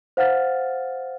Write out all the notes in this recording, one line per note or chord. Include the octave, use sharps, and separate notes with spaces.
C5 F5 F#5 F6 A6